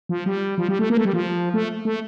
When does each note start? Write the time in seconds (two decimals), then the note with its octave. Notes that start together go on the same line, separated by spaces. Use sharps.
0.09 F3
0.26 G3
0.58 F3
0.68 G3
0.79 A3
0.90 A#3
0.97 A3
1.05 G3
1.13 F3
1.54 A3
1.85 A3